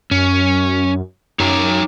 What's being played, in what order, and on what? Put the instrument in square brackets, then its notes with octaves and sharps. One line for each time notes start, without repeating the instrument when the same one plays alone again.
[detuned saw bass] F#2 [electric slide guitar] C#4
[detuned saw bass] F#2 [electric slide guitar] D#4 C#5 A#5